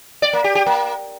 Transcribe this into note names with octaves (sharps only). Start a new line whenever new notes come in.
D5
A#3
G4
G4
A#3